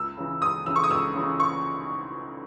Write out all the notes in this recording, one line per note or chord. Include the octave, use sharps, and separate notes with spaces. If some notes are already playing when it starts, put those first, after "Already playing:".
Already playing: C#2 E6
C#3 E3
C#2 D#6
C#3 E3 E6
C#6
D#6
C#2 E6
C#3 E3
C#6